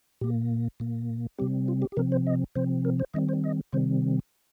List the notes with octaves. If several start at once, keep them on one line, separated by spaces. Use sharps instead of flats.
A#2 A#3 G4
A#2 A#3
C3 G3 C4 G4
F4
G4
G4
C3 F3 C4 A#4
C5
D#5
C3 F3 C4 C5
A#4
C5
D#3 G3 C4 D#5
C5
D#5
C3 D#3 G3 C4 C5